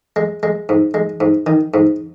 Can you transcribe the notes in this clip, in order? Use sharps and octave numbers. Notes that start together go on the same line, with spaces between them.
G#3
G#3
G#2
G#3
G#2
D#3
G#2